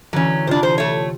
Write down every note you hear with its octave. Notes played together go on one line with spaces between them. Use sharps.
D3 E3 F#3 C#4
C3 D4 F4 C5
C5
A3 C#5